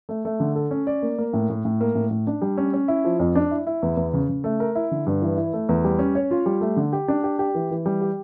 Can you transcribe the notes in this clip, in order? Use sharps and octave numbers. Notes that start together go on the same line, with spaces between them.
A3
A3
D3
A4
C#4
D5
A#3
A#3
A2
A2
A2
A#3
A2
A2
D4
G3
C#4
C#4
E4
F3
F2
D4
E4
E4
E2
E2
C#3
C#3
A3
A#4
E4
D3
G2
E3
E4
A3
E2
G3
C#4
C#5
F4
G3
A3
D3
G4
D4
G4
G4
E3
E3
G3
G4